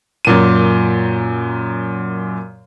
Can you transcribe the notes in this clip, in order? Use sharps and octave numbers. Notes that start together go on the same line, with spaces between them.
F#2 A#2 D#7